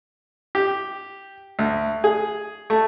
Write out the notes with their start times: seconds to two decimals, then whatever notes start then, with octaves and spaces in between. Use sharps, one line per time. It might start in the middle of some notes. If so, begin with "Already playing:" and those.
0.55 G4
1.59 D2
2.04 G#4
2.70 A3